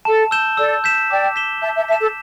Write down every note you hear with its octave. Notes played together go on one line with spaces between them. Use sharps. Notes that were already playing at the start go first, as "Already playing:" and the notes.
A4 A5
E6 G6 E7 G7
A4 D5 E6
G6 B6 E7
D5 G5 D6
B6 E7 G7
E5 A5 G6
E5 A5
E5 A5 B6 E7
A4